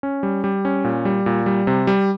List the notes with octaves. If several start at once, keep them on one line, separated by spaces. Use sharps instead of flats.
C#4
G3
G3
C#4
A#2
G3
A#2
G3
C3
G3